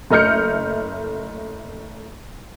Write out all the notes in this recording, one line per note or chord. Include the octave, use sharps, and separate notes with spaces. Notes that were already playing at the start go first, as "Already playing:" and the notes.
F#1 A3 D#5 F6 G6 C#7